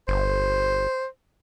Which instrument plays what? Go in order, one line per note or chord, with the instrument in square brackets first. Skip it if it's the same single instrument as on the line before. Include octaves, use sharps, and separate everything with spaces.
[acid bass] G1 [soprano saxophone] C5